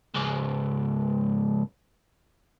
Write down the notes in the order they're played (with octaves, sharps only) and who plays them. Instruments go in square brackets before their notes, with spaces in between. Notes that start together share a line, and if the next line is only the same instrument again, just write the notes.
[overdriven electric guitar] C#2 G#2